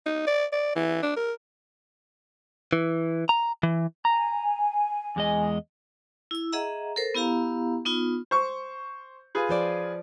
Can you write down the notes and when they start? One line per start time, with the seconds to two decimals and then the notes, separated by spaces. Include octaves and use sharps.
0.06 D#4
0.27 D5
0.52 D5
0.75 E3
1.02 D4
1.16 A#4
2.73 E3
3.29 A#5
3.63 E3
4.05 G#5 A#5
5.16 E2 G#3 D#5
6.31 E4 E6
6.52 G#4 D#5 E5 F#5 A#5
6.96 A4 A#4 C5
7.15 B3 E4 G4 F5 A#5
7.85 B3 D#4 F4
8.31 C5 C#6
9.35 F4 G#4 B4
9.49 F3 C5 D5